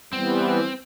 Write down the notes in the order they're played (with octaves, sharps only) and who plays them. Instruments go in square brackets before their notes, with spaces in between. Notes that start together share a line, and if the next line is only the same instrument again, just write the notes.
[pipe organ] E3 G3 B3 [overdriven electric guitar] C4